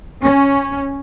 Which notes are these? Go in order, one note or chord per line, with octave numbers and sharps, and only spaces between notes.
C#4